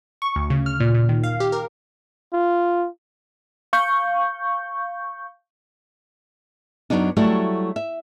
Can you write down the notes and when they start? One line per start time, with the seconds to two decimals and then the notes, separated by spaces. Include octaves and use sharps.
0.22 C#6
0.36 D2
0.50 C#3
0.66 F6
0.80 A#2
0.94 A#2
1.09 D#3
1.24 F5
1.40 G4
1.52 A#4
2.33 F4
3.73 F5 C#6 G6
6.90 F#2 D3 F#3 B3 D4 D#4
7.17 F#3 G3 A3 E4 F#4
7.76 E5